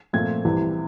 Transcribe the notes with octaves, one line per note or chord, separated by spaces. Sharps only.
A#2 F3 A3 C4 G#6
C2 C3 E3